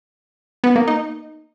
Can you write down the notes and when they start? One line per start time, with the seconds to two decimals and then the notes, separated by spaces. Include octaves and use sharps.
0.64 B3
0.76 A#3
0.88 D#4